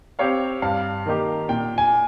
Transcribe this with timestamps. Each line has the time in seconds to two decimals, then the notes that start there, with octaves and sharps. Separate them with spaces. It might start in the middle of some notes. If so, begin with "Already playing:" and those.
0.19 C4 G4 C#5 F5
0.62 G2 F5
1.06 D#3 A#3 D#4 G4
1.49 A#2 G5
1.78 G#5